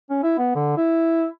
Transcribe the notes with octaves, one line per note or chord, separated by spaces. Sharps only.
C#4
E4
B3
D3
E4